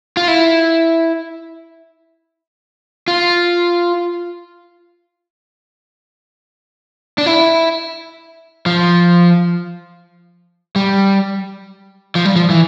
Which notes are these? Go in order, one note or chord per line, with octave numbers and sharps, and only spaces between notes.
F4
E4
F4
D4
E4
F3
G3
F3
G3
F3
E3